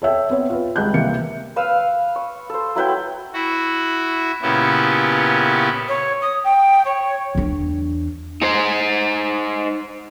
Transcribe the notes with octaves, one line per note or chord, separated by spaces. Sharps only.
A4 C#5 E5 G5
B3 C4 C#5
F4 B4
C#2 G3 F#6 G6
C3 E3 A#3 C#7
B4 F5 E6
C#6
A4 C5
F#3 E4 B4 G5
E4 F#4
A#2 C#3 B3 C#4 E4 G4
C#5
D#6
G5
C#5
E2 D4
D#4 C5